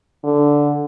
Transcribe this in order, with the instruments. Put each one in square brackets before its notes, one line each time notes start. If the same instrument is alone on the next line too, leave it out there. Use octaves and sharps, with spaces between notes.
[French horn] D3